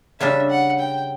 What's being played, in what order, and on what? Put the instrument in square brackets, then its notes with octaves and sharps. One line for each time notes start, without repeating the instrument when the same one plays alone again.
[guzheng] C#3 G3 D4 [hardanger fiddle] E5
[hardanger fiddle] F#5
G5